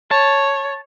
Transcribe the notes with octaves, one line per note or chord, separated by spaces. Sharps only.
C#5 A5